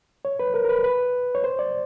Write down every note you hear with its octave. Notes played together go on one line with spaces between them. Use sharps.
C#5
B4
A#4
A#4
B4
B4
C#5
C5
D5